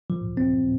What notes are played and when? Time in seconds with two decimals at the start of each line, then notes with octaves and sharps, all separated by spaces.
0.10 F3
0.37 C4